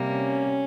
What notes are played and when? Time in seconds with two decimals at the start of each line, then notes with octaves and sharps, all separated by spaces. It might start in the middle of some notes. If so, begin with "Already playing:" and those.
Already playing: C3 G3 A#3
0.10 C#4